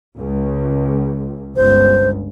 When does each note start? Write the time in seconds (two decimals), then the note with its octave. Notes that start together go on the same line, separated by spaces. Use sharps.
0.18 C#2
1.56 G1 C#2 C5